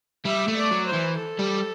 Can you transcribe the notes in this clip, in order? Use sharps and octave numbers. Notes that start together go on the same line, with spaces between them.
G3 E5
A3
D5
F#3
C5
E3
A4
G3